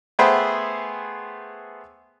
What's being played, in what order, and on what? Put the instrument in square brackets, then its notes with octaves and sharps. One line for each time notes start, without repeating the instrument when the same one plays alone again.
[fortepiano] A3 B3 G#4 B4 C5 G5